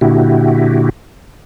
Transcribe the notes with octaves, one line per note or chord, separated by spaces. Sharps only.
A#2 D3 E4 F#4 G4